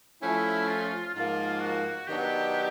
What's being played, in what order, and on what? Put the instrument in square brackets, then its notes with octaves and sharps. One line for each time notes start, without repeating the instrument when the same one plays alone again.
[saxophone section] F3 A3 C#4 [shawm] E4
[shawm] F4
[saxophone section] G#2 F3 A#3 [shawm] F4
[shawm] F#4
[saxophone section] D#3 F#3 B3 D4 [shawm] G4